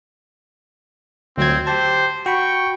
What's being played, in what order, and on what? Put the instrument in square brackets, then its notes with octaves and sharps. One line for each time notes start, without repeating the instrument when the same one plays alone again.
[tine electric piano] D2 F#3 G#6 [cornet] C4 [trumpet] F4
[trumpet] G4 [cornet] C5 [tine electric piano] A5
[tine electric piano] F#4 B5 [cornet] G5 [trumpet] C#6